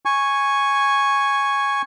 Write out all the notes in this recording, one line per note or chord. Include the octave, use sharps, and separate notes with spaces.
G#5 C#6